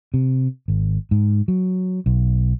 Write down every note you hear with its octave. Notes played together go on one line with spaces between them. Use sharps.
C3
G#1
G#2
F#3
B1